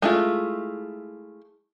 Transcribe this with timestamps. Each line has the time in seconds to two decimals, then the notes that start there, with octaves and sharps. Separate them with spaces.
0.02 G#3 A3 E4 F4